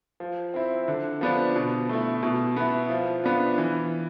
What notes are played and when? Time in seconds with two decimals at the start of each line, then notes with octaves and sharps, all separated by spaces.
0.20 F3
0.54 C4 E4
0.88 D3
1.21 F3 B3 D4
1.56 B2
1.89 A3 E4
2.23 B2
2.57 B3 E4
2.90 F3
3.24 B3 D4 F4
3.58 E3